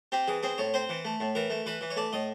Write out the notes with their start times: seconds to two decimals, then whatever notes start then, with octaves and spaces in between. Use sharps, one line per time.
0.12 C4 G4
0.28 E3 G#4
0.43 C4 G#4
0.58 A2 C#5
0.74 C4 C5
0.89 E3
1.05 A3
1.20 A2
1.35 E3 A#4
1.50 A3
1.66 E3 B4
1.81 E3
1.90 C#5
1.96 A3 D5
2.13 A2 D#5